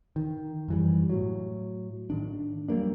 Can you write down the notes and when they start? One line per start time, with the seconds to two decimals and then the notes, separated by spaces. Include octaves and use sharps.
0.16 D#3
0.68 F#2 E3 G3
1.10 A2 F#3
2.10 A2 D#3 D4
2.69 F#3 G3 A#3 D4